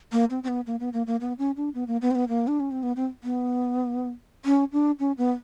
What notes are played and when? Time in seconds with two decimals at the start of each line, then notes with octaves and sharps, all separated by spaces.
0.12 A#3
0.30 C4
0.43 C4
0.48 B3
0.66 A#3
0.80 B3
0.93 A#3
1.07 A#3
1.20 B3
1.38 C#4
1.56 D4
1.74 B3
1.87 A#3
2.02 B3
2.11 C4
2.15 B3
2.28 A#3
2.47 D4
2.60 C#4
2.71 C4
2.83 B3
2.96 C4
3.24 B3
4.45 C#4
4.72 D4
4.99 C#4
5.18 B3